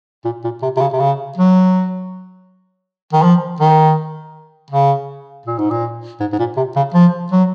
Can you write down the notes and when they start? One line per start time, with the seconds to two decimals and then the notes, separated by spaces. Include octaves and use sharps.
0.25 A#2
0.44 A#2
0.62 C3
0.77 C3
0.81 C#3
0.93 C3
1.00 C#3
1.37 F#3
3.13 D#3
3.23 F3
3.60 D#3
4.70 C#3
5.46 A#2
5.58 G#2
5.71 A#2
6.20 G#2
6.33 G#2
6.39 A#2
6.57 C3
6.76 C#3
6.94 F3
7.32 F#3